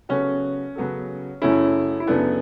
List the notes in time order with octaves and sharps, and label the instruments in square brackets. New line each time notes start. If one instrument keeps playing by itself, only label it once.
[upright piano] C#3 F#3 B3 F#4 A4 [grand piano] C#4
[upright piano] C#3 F#3 B3 F#4 A4
[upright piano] F#2 C#3 F#3 A3 [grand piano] C#4 E4
[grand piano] E4
[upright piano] F#2 C#3 F#3 A3 [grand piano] B3 D4